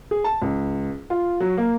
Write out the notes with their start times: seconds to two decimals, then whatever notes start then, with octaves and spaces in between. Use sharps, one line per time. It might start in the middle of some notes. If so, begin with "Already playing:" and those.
0.11 G#4
0.24 A5
0.42 C#2
1.10 F4
1.40 F#3
1.57 A#3